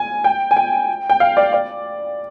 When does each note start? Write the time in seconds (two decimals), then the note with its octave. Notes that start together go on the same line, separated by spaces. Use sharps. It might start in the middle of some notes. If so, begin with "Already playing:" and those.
Already playing: G#5
0.24 G5
0.51 G#5
0.57 G5
1.10 G5
1.20 F5
1.37 D5
1.53 D5